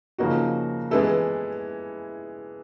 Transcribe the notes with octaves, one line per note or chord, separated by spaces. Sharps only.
C#3 F3 A#3 D#4 F#4
E3 G#3 B3 E4 A4